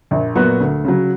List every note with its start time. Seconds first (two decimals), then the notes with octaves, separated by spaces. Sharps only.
0.11 A#1
0.35 A#2 F#3 B3 F#4
0.60 D2
0.84 C#3 F#3